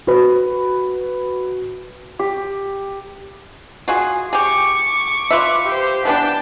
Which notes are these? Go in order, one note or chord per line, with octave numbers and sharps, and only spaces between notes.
F#4 B4
G4
F4 F#4 G#4
G4 G#4 C#6 D6
F4 B4 E5
G4 C5
E3 B3 D4 G5 A5